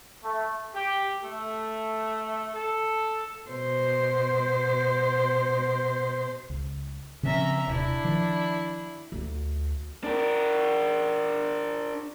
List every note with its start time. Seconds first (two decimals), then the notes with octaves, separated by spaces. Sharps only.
0.24 A3
0.75 G4
1.24 A3
2.55 A4
3.49 B2 C5
6.50 C#2
7.23 C#3 F3 C4 C#4 E5 A#5
7.68 D#1 C3 D4 E4
8.04 D#3 F3
9.12 D2
10.04 D4 A#4